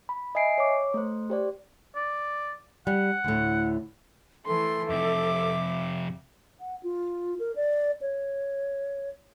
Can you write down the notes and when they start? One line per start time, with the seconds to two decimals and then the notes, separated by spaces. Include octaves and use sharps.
0.09 B5
0.35 D#5 E5 G#5 C7 D7
0.58 C#5 D6
0.94 A3 C5
1.30 G4 C5 D5
1.95 D5
2.87 G3 F#5
3.24 D2 A2
4.46 E3 A3 A4 C6
4.90 F2 C3 E5 D6
6.59 F#5
6.83 F4
7.39 A#4
7.56 D5
8.01 C#5